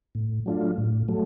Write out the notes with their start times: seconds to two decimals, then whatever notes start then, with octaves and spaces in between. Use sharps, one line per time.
0.15 A2
0.46 F#3 A3 D4 F4
0.78 A2
1.08 F#3 A3